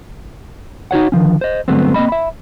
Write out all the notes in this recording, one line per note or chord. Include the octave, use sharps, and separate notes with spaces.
D#4 F#4 C#5 F#5
D3 D#3 F3 C#4
C5 D#5
G2 D3 F#3 A3 B3 C4
A#3 C4 D#5 B5
E5 B5